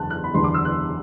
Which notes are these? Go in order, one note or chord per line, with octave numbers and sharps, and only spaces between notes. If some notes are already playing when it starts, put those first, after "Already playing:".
Already playing: F#1 E2 D3 A5 F#6
F#6
B5
F#1 E2 D3 C6
D6
E6
F#6